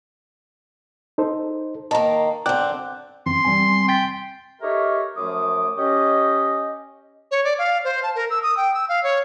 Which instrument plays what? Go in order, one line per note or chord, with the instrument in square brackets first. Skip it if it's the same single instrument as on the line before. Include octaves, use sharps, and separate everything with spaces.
[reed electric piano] D#4 A4 C5
[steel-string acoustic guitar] D#3 A#3 [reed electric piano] A5 A#5
[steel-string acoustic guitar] D3 C4 [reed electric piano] G5 D6 F#6
[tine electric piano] F#2 E3 C4 [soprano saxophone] C6
[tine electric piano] G3 C4 G#5
[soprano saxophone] G5 [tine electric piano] C6 A6 B6
[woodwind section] D#4 G4 A4 A#4 C#5 E5
F#2 F3 A3 D6 D#6
C#4 G4 D#5
[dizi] C#5
D5
F5
C5
A5
A#4
E6
D#6
G5
E6
F5
C#5